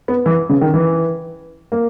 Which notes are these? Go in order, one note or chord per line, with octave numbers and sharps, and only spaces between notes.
B3
E3
C#3
D#3
E3
A#3